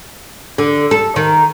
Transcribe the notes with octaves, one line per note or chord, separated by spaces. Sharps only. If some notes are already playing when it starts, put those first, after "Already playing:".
D3
A4
D#3